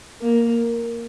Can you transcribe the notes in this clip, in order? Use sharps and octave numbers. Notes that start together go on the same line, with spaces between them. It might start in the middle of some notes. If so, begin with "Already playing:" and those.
A#3